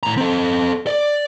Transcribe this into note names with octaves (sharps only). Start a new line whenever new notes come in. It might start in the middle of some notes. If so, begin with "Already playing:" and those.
A2 A#5
C4 A4
D5